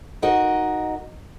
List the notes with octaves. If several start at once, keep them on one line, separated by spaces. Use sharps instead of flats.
D#4 F#4 A#4 D#5